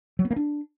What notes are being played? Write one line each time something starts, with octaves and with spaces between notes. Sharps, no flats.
F#3
B3
A#3
D4